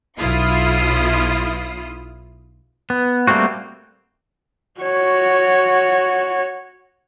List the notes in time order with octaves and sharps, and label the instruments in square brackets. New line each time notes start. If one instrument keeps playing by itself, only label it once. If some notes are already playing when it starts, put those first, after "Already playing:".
[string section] B1 E4 F4 D#6 C7
[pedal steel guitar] B3
G3 A3 A#3 C4 F#4
[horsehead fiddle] F#4 C#5